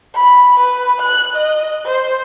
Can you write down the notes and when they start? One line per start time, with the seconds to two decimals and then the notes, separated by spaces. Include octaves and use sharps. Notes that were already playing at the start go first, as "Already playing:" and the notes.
0.14 B5
0.59 B4
1.00 F#6
1.35 D#5
1.86 C5